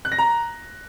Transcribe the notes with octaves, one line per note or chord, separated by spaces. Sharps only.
F#6
A#6
A#5